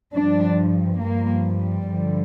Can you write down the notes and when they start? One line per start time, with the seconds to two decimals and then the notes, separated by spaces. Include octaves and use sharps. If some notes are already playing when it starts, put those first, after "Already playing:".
0.14 G2 F3 D4
1.00 G2 F3 A#3
1.44 G3
1.87 G2 D3 F3